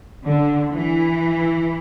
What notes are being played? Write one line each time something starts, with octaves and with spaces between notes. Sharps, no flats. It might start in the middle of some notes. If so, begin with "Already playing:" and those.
D3
E3